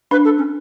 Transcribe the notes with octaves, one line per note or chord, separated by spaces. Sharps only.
D4 B4
A4
C#4